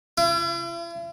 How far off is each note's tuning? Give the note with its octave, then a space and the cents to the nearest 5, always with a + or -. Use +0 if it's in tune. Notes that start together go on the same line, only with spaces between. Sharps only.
E4 +45